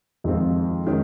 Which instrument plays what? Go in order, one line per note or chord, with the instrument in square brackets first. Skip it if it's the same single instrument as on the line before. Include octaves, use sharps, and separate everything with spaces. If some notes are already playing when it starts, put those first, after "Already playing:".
[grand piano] F2 D#3 G#3 C4 F4
D#3 G#3 C#4